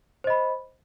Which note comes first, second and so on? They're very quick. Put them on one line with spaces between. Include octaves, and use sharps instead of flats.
C5 D#5 B5